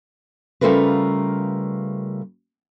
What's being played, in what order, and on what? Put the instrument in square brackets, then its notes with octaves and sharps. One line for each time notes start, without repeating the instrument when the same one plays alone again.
[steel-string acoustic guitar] C#3 G3 A3 F4 A#4 B4